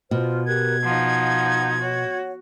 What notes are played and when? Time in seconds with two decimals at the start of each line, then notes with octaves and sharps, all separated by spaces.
0.11 B2 F4 C5 F6
0.47 G4 A#4 F#6 G#6
0.83 F3 D#4 F5 F#5
1.80 F#4 C#5 F#5